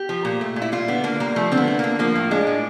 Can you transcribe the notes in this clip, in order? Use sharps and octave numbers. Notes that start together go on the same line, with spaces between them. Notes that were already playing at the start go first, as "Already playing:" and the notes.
Already playing: G4
F3
A#2
A3
A#2
E4
G3 F4
D3 B3
D3 A#3
G3 A#3
F3 A3
D3 C4
B3
A3
D3 A#3
F3 A#3
A2
G#3 D4
A2